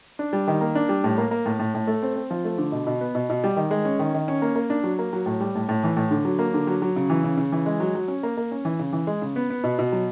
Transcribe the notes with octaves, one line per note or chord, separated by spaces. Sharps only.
D4
G3
D#3
A#3
D4
G3
A2
A#3
A#3
A2
A2
A2
A3
C4
C4
F3
A3
D3
B2
B2
B3
B2
B2
G3
D#3
G#3
C#4
D#3
D#3
C#4
A#3
A#3
D4
F#3
A#3
F#3
A2
G3
A2
A2
E3
A2
D3
F#3
A#3
D3
F#3
F#3
C#3
E3
C#3
C#3
E3
G#3
F#3
F#3
C#4
A#3
A#3
C#4
E3
C#3
E3
G#3
C#3
B3
B3
B2
B2
F#3